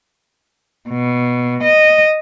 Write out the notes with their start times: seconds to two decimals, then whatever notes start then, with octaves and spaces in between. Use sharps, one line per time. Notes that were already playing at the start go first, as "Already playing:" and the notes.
0.89 B2
1.63 D#5